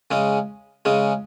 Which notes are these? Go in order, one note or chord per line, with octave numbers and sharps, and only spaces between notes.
C#3 G#3 C#4
C#3 G#3 C#4